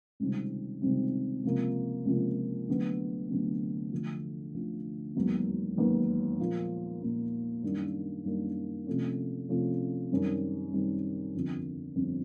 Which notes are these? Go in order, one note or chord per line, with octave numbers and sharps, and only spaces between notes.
C#2 C3 D#3 G3 C4
C#2 C3 D#3 G3 C4
C#2 C3 F3 A#3
C#2 C3 F3 A#3
D2 D3 F#3 B3
D2 D3 F#3 B3
D2 D3 F3
D2 D3 F3
E1 D#2 D#3 F#3 B3
E1 D#2 D#3 F#3 B3
A#2 F3 A#3
A#2 F3 A#3
F#2 D#3 G3 A#3 D4
F#2 D#3 G3 A#3 D4
C3 F3 A3 C#4
C3 F3 A3 C#4
F#2 D#3 G3 C4
F#2 D#3 G3 C4
G1 F2 D3 F3
G1 F2 D3 F3